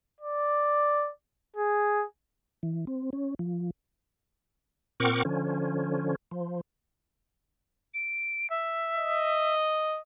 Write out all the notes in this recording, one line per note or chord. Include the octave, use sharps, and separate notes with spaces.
D5
G#4
E3
C4
C#4
F3
A#2 C4 A#4 F#5 C#6 D6
D3 F3 C#4
F3
D7
E5
D#5